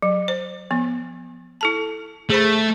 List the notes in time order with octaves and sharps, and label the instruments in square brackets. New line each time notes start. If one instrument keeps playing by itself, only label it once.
[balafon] F#3
C5
F3 B3
E4 A4 A5
[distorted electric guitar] A3 [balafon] G#4 C5 B5